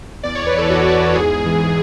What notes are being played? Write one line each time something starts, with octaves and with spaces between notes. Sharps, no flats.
E2 D5
E2 C#5
B4
E3 A4
E2 F#4
E3 F#4
E2 F#4
G#2 G#4
G#2
E3